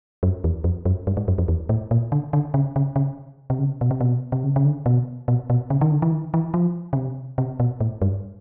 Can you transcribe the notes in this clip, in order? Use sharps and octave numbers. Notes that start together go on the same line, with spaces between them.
F#2
E2
F2
F#2
G2
G#2
F#2
F2
E2
A2
A#2
D3
D3
C#3
C#3
C#3
C3
C#3
B2
C3
B2
C3
C#3
C#3
D3
B2
B2
B2
C#3
D#3
D3
E3
D#3
E3
F3
C#3
C3
C3
B2
A2
G2